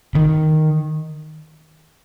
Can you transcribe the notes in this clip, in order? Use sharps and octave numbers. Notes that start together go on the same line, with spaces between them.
D#3